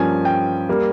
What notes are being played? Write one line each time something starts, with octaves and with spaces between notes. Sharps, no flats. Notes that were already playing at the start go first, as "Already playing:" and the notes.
Already playing: G2 F3 A#3 C#4 G#5
G5
G3 A#3